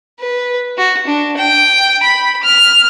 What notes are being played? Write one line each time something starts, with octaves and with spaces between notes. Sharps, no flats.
B4
F#4
D4
G5
B5
F6